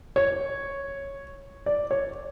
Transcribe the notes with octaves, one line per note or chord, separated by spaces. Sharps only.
C#5
D5
C#5